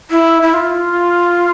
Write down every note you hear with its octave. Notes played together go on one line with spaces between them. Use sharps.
E4
E4
F4